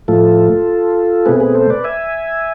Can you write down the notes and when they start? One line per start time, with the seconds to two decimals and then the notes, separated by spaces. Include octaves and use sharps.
0.08 A2 F3 A3 F4 A4
1.26 B2 A3 C4 G#4 B4
1.40 G#4 B4
1.55 A4 C5
1.70 B4 D5
1.84 E5 G#5